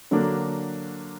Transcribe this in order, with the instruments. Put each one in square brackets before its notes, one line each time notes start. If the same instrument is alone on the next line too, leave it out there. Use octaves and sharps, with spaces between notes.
[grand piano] D3 F#3 A#3 D4